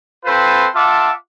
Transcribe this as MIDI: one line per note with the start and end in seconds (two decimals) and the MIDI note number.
0.25 0.67 60
0.25 0.67 65
0.25 0.67 69
0.25 0.67 71
0.25 0.67 72
0.75 1.11 65
0.75 1.11 76
0.75 1.11 78
0.75 1.11 81
0.75 1.11 86